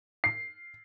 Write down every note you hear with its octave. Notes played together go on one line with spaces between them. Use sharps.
C7